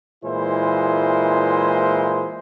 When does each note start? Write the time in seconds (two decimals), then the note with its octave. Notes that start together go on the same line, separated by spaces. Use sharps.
0.24 A#2 E3 G#3 E4 C5